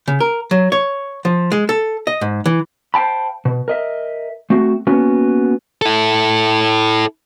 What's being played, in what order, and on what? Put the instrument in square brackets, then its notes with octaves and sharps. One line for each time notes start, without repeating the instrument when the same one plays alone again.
[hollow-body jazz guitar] C#3
A#4
F#3
C#5
F3
G#3
A4
D#5
G#2
E3
[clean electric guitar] C5 F5 G5 A5 B5
B2
A#4 D#5 E5
A3 C4 F#4
A#3 B3 C#4 F#4
[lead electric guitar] E4 A4